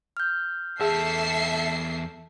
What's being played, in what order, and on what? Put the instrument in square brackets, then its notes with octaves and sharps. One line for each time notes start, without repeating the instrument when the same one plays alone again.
[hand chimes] F6 G6
[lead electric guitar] E2 A5 [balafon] G#4 [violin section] A4 E5 C7